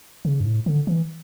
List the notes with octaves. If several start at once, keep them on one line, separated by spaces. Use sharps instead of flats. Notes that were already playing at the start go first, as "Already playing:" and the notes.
C#3
G2
A2
D3
E3